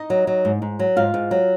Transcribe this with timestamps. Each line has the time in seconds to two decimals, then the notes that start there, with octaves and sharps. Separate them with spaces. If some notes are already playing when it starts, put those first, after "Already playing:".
Already playing: D#4 D#5
0.10 F#3
0.27 F#3
0.45 G#2
0.62 G#2
0.79 F#3
0.96 G#2 F4 F5
1.14 G#2
1.31 F#3